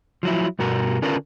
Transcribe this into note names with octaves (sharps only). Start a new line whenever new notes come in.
F3 F#3 E4
G2 B2 F#4 A#4
D3 C#4 D4 F4 A#4 B4